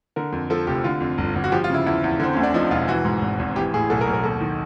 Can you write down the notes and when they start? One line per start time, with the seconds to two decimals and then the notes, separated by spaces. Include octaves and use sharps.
0.16 D3 A#4
0.32 F2
0.50 F3 A4
0.67 F1 G4
0.84 D3 F4
1.00 F2
1.18 G1
1.35 G1
1.44 F#4
1.52 F3 G4
1.64 F4
1.70 C#3 E4
1.86 E2 E4
2.04 E2
2.20 D3 C4
2.33 D2 C#4
2.43 D4
2.54 F3 D#4
2.71 E1 F4
2.88 E3 F#4
3.05 G#2
3.22 G#1
3.39 G#1
3.56 E3 G4
3.74 A2 G#4
3.90 B1 A4
4.01 A#4
4.08 B1
4.13 A#4
4.24 D#2 A4
4.41 D#3